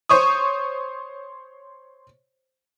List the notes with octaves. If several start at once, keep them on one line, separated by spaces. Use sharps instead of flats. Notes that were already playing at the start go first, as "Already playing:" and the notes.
C5 C#5 C#6 D#6